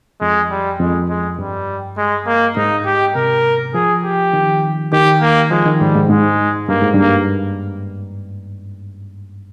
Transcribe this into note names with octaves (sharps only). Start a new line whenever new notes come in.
F2 G#3
G3
F2 G#3
G#3
G2 G3
G#3
A#3
G#2 D#4
G4
C3 A#4
F3 G#4
G4
D#3
D#3 G4
A#3
F3 G#3
D#3
G#2 G3
G#2
G#2 G#3
G2 A#3
G#2
G2 A#3